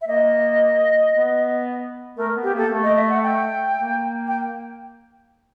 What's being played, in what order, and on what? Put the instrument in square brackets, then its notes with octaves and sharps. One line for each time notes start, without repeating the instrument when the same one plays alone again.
[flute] E5
[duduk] A#3 [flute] D#5
[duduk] B3
[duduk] A3 [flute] A#4
[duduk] B3
[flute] G4
[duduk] A#3 [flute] A4
[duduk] A3
[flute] D#5
E5
F#5
G5
[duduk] A#3
[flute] G5